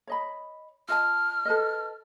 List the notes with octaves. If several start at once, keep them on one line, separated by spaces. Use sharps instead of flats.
C#5 D#5 B5
F4 D#5 A5 F6
A4 B4 D#5